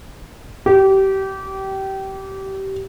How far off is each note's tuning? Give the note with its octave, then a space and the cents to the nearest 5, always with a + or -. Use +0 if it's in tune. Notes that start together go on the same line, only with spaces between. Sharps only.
G4 -25